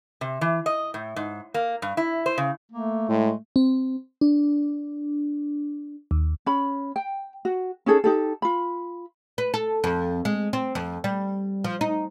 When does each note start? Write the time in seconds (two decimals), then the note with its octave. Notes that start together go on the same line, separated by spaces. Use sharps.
0.21 C3
0.41 E3
0.66 D#5
0.94 A2
1.16 G#2
1.54 A#3
1.82 G2
1.97 E4
2.26 C5
2.38 C#3
2.72 A3 A#3
3.09 A2 G#3
3.56 C4
4.21 D4
6.11 D#2
6.46 C#4 B5
6.96 G5
7.45 F#4
7.86 C#4 D#4 G#4 A4
8.04 D#4 G4 A4
8.42 F4 B5
9.38 B4
9.54 A4
9.84 F2
10.25 G#3
10.53 C4
10.75 F2
11.04 G3
11.64 F3
11.81 D#4